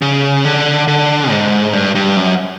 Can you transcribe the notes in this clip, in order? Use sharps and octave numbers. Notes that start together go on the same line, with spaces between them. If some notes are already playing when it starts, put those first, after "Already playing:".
C#3
D3
D3
G#2
G2
G2
F#2